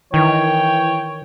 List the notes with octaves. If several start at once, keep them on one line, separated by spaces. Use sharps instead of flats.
D#3 E3 C#5 G5